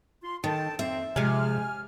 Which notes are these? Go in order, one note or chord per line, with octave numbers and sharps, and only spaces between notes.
F4 C6
D#3 A4 G5 A5
F2 A#3 C4 E5
C3 F3 G#3 G#5 F6